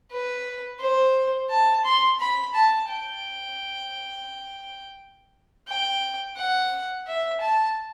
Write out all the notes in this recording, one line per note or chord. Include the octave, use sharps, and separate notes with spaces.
B4
C5
A5
C6
B5
A5
G5
G5
F#5
E5
A5